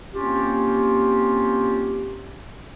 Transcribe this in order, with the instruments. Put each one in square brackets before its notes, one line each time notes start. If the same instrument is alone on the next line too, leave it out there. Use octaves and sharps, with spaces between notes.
[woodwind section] A#3 C4 C#4 F4 G4